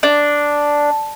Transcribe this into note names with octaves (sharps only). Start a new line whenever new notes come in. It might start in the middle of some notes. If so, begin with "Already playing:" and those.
D4